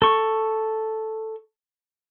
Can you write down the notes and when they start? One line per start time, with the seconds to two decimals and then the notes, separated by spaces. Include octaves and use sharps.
0.02 A4 C#6